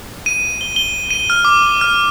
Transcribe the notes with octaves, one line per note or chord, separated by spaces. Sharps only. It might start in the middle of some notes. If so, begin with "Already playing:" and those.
D#7
G7
G7
D#7
F6
D6
F6